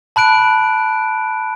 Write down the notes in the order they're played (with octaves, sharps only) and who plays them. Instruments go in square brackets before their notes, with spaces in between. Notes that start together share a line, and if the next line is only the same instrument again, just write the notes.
[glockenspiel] A5 B5 F#6 D7